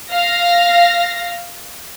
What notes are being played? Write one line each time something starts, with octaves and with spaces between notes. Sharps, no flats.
F5 A#6